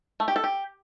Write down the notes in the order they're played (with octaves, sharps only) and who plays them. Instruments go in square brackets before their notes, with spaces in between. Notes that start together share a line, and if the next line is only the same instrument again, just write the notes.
[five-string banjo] A3
G4
A4
G4